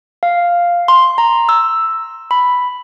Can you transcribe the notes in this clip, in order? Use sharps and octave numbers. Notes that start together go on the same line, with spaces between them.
F5
C6
A#5
E6
B5